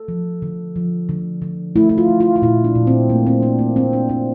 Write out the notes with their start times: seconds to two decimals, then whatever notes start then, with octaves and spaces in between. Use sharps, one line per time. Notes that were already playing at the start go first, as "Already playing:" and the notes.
Already playing: A4
0.08 F3
0.42 D3
0.76 F3
1.09 D3
1.42 D3
1.76 A3 E4
1.89 E4
1.98 F4
2.09 A3
2.20 F4
2.36 F4
2.42 A#2 E4
2.64 D4
2.75 A#2
2.87 C4
3.09 A3 A#3
3.27 C4
3.42 A3 D4
3.59 A#3
3.76 A3 C4
3.93 D4
4.09 A#2 D4